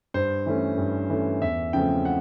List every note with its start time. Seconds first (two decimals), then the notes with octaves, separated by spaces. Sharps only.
0.14 G2 C5
0.46 E3 A3 C#4
0.78 G2
1.10 E3 A3 C#4
1.42 E2 E5
1.73 C#3 F3 A3 C4 G5
2.05 F#5